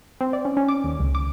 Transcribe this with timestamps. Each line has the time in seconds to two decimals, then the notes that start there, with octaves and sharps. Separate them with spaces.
0.21 C4
0.33 D5
0.45 C#4
0.57 C#4
0.69 D6
0.84 D#2
1.00 C#2
1.15 D6